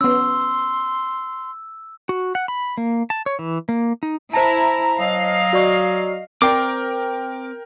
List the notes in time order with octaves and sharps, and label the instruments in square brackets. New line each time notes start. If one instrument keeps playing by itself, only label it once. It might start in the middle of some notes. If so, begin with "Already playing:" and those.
[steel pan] B3 C#4 [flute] C6 [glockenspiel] E6
[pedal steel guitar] F#4
F#5
B5
A#3
A5
C#5
E3
A#3
D#4
[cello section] E4 [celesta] C5 A5 [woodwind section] A#5
[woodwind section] F#3 D#5 [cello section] F5
[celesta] F#4 D5 C#6
[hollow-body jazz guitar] C4 C5 D5 [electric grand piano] A#4 G5 [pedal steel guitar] D6